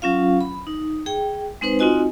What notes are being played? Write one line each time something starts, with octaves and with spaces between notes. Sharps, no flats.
F#3 C#4 F4 F5
B5
D#4
G#4 G5
G#3 C4 D#4 B4 C5
C4 D#4 F4 F#4 D#5 G#5